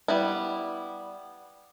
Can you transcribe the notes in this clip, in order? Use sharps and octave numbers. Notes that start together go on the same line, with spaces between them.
G3 B3 E4